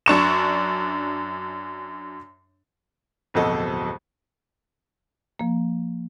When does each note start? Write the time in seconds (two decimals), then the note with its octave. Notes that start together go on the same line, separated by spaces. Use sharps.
0.06 F#2 D4 C#6 E7
3.34 D1 F2 B2 F#4 A4 D#5
5.39 F3 A#3